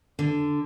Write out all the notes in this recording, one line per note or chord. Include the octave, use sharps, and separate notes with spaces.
D3